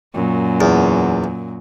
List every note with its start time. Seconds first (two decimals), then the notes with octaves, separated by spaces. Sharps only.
0.14 F#2 A#2
0.61 E2